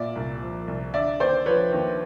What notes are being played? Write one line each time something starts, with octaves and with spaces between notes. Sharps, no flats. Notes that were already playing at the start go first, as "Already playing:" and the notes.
Already playing: A#2 D5 E5
C2
F3
C2
D3 D5 E5
D#2 C5 D5
F3 B4 C#5
D#2